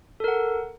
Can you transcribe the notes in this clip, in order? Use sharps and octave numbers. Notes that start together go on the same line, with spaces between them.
A4 A#4 F#5